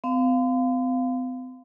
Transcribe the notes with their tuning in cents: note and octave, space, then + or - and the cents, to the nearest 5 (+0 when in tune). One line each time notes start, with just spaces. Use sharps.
C4 -45 F5 +0